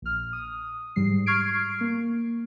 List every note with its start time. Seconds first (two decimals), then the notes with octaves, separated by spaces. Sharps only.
0.02 A#1 F6
0.33 D#6
0.96 G#2 G3 C7
1.26 C#6 F6 G#6 C7 D7
1.81 A#3